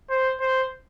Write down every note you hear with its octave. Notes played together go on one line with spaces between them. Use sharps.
C5
C5